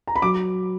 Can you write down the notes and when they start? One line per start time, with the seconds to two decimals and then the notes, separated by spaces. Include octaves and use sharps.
0.07 A#5
0.16 B5
0.22 F#3 D6